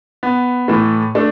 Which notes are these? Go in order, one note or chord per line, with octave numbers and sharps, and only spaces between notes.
B3
A2 E3 A3
A3 D4